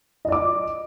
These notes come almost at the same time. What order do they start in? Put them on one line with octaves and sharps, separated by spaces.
D#5 D5 D6